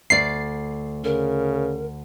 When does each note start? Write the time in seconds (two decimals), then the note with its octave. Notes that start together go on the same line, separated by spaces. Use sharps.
0.10 D2 D5 C7
1.04 C#3 A#4